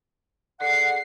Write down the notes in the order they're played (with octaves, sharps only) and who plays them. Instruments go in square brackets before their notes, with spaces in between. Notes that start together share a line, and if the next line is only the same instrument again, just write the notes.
[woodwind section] D3 G#4 F#5 [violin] C7